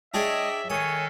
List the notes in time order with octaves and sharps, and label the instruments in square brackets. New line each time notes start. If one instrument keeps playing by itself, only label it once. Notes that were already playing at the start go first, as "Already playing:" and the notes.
[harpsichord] D4 G#4 C#5 [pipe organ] D#5 D#6 [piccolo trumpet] E5 [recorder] G5
[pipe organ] D#3 A4 [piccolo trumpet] C#5 [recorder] G#5 [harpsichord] D#6